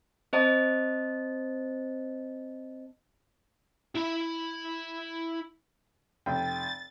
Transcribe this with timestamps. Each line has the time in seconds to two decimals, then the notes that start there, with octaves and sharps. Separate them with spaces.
0.33 C4 C5 D#5 A5
3.95 E4 B5
6.26 F1 G5 A6